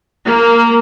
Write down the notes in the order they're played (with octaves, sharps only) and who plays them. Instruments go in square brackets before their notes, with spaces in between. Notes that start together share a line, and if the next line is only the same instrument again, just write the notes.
[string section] A#3